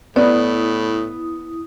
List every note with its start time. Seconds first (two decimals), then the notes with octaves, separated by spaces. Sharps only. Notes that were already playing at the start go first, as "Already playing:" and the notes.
0.16 A2 B3 E4 D5 D#6